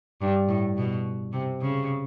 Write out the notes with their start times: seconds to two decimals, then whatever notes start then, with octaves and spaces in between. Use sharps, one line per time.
0.21 G2
0.48 A2
0.77 B2
1.33 C3
1.61 C#3